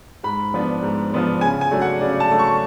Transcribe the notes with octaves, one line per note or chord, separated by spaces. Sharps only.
G#2 B5
F3 B3 D4
G#2
F3 B3 D4
C#3 G#5
G#5
F#3 A3 D4
F#5
C#3 D5
A5
F#3 A3 D4
C#6